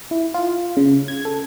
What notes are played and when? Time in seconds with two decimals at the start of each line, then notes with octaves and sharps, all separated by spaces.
0.11 E4
0.34 F4
0.77 C#3
1.08 G#6
1.25 A4